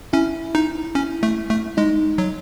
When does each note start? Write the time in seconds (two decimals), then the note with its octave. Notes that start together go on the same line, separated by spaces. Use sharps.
0.13 C#4 E4
0.55 D#4
0.95 C#4
1.23 A3
1.50 A3
1.77 G#3 D#4
2.18 F#3